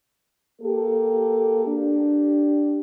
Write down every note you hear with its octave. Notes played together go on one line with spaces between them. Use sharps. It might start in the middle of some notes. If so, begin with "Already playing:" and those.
A#3 G4 A4
D4 G4